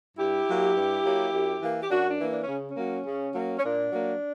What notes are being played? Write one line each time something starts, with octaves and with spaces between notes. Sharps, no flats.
G2 E4 G4
F#3 A#3
G2
F#3 A#3
F#2
E3 A#3
G4
F#2 D4 F#4
D4
E3 A#3
D4
C#4
C#3
C#4
F#3 A#3
C#3
F#3 A#3
C#4
A#2 D4
F#3 A#3